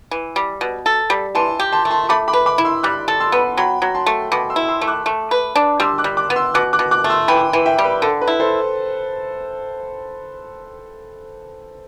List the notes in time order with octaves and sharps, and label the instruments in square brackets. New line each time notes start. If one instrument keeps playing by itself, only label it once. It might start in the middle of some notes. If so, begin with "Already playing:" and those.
[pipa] E3
G3
B2
A4
G3
[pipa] E3 [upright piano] A5 C6
[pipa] G4
[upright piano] A5 C6
[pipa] A3
[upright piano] A5 C6
[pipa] A3 [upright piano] B5 D6
[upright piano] B5 D6
[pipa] B4
[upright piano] B5 D6
[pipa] E4
[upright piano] C6 E6
[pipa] G3 [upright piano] D6 F#6
[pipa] A4
[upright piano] C6 E6
[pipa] B3
[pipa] F#3 [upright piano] G5 B5
[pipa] F#3
[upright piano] A5 C6
[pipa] A3
[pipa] B2 [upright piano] B5 D6
[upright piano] C6 E6
[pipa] E4
[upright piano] C6 E6
[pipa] A3
[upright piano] D6 F#6
[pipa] A3
B4
D4
[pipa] G3 [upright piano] C6 E6
[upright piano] D6 F#6
[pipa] G3
[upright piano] D6 F#6
[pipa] B3
[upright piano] C6 E6
[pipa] B2 [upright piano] D6 F#6
[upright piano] D6 F#6
[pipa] B2
[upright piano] D6 F#6
[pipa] A3
[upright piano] C6 E6
[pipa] E3 [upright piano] G5 B5
[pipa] E3
[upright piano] E5 G5
[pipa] G3
[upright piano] B4
[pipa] D3 [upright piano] A4
[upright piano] B4
[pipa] E4
[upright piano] A4 C5